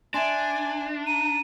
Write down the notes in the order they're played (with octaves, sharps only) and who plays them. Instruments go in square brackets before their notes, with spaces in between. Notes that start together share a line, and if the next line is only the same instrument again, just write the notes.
[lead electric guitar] D4 [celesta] E5 C6 [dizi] G#5
[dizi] A#5 [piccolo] D#7